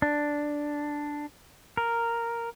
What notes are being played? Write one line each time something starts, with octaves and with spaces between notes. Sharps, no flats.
D4
A#4